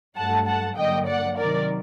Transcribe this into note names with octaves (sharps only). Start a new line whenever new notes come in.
G2 F#3 A3 F#5 A5
F#5 A5
G2 D3 F#3 A#3 D#5 G5
D5 F#5
C3 D#3 F#3 A#4 D5